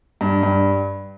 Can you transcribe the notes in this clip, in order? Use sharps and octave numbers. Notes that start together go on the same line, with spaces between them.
G2
G2